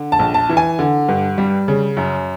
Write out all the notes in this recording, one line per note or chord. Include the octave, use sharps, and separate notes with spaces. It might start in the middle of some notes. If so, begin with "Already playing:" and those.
Already playing: D3
A5
A#1
A5
E3
G#5
D3
G2
G3
C#3
F#2